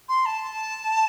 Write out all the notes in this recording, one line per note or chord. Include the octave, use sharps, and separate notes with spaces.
C6
A5